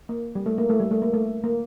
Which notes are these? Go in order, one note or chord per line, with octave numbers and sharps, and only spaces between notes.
A#3
G3
A3
A#3
A3
G3
A3
A#3
A3
A#3